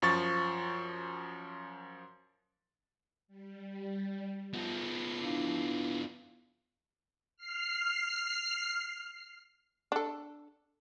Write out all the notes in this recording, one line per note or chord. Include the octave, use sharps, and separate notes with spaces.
F#2 F3 C#6 A6
G3
F3 B3 F#5 C7
D4 E4 F5
F6 C7
D4 A4